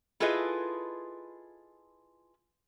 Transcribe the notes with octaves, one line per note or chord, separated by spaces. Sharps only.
E4 F4 G#4 A4 B4 D#5